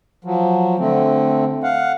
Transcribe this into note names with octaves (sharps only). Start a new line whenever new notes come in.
F3 F#3
D3 A3 C4
F5 F#5